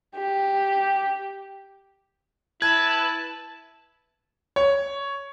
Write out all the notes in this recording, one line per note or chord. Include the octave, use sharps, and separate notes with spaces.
G4
E4 B4 A5 G#6
C#5